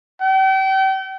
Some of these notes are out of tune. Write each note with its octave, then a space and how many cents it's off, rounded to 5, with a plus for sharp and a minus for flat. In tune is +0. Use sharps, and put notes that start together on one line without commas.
G5 -40